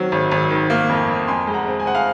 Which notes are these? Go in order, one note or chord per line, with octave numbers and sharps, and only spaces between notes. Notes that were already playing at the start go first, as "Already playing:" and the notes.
Already playing: D#3 F#3 C4
G#1
G#1
D#3
A#3
F2
F2
F2 G#5 C6
G#3
F#5 A#5
C4
G#5
C4 F#5
F5 G#5